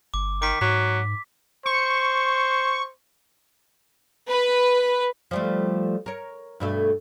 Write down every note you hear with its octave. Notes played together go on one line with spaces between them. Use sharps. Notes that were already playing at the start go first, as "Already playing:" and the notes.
G1 D6
D#3 D6 B6
G#2 F#3 B6
C5 C#6
B4
F3 G3 A3
A#4 C#5
G2 B2 A3